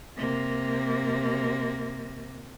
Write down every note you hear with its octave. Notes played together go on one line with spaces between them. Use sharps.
C3 A#3